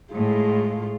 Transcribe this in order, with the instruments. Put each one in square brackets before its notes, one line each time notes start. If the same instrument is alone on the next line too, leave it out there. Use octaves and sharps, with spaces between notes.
[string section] A2 [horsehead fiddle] G#3 F4